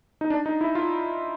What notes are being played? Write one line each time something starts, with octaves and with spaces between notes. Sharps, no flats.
D#4
D4
D#4
E4
F4